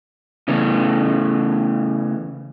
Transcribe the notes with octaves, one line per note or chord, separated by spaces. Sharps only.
C#3 E3 A3 B3